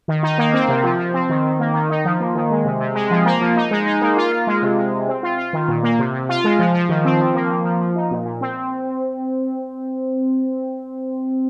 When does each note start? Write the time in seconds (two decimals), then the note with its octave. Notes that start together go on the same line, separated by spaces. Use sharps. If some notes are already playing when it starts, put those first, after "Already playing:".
0.08 D#3
0.23 D#4
0.38 A#3
0.53 C4
0.69 C3
0.84 F3
0.99 F3
1.14 C4
1.29 D#3
1.44 D#3
1.59 A#3
1.74 D#3
1.90 D#4
2.05 F3
2.20 A#3
2.35 D#3
2.50 G#3
2.65 C3
2.81 C3
2.95 G#3
3.11 F3
3.25 A#3
3.41 F3
3.56 D#4
3.71 G#3
3.86 D#4
4.01 A#3
4.17 F4
4.32 F4
4.47 G#3
4.62 C3
4.77 G#3
4.92 C3
5.08 C4
5.23 F4
5.38 F4
5.53 D#3
5.68 A#2
5.83 A#3
5.99 C3
6.13 C3
6.29 F4
6.44 G#3
6.59 F3
6.74 F3
6.89 D#3
7.05 C4
7.20 F3
7.35 A#3
7.50 F3
7.65 F3
7.80 F3
7.95 D#4
8.11 A#2
8.25 A#2
8.41 C4